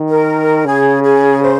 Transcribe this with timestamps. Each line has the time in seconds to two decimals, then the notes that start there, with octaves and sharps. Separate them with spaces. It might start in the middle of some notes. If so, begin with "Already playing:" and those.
Already playing: D#3
0.09 A#4
0.65 C#3 G#4
1.03 G#4
1.42 C5